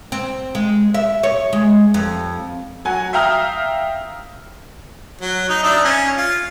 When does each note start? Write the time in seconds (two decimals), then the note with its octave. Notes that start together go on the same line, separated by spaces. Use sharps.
0.12 C4
0.55 G#3
0.94 E5
1.23 C#5
1.53 G#3
1.94 F2
2.85 F#3 F#4 G#5
3.13 E5 F5 G5 A#5 D#6 F6
5.21 F#3
5.49 D#4
5.63 D4 D#4 E5
5.85 C#4
6.17 F4